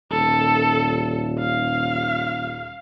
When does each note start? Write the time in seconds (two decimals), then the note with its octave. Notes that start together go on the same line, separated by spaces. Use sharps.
0.11 D#1 A4
1.38 F5